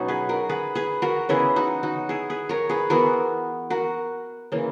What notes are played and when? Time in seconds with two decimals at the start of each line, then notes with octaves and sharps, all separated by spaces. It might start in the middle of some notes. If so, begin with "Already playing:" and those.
Already playing: B2 F#3 B3 C#4 D#4 F#4
0.08 G#4 B4
0.29 F#4 A#4
0.49 G#4 B4
0.75 G#4 B4
1.02 F#4 A#4
1.29 C#3 E3 B3 E4 G#4
1.56 D#4 F#4
1.83 D#4 F#4
2.09 E4 G#4
2.30 G#4 B4
2.49 A#4 C#5
2.69 G#4 B4
2.90 E3 B3 F#4 A#4
3.70 F#4 A#4
4.52 C#3 E3 A#3